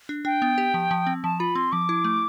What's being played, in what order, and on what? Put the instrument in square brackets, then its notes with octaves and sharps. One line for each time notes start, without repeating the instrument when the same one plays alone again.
[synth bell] D4
[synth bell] D4 [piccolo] G5
[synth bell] B3
G4
F3
F3
C4
[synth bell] F3 [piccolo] A5
[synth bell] F4 [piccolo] B5
[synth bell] C4 [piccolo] C6
[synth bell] F3 [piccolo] D6
[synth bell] E4
A3